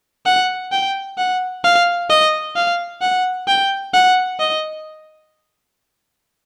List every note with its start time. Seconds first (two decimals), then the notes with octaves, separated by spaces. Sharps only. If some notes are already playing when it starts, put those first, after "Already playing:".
0.26 F#5
0.72 G5
1.18 F#5
1.64 F5
2.10 D#5
2.56 F5
3.02 F#5
3.48 G5
3.94 F#5
4.40 D#5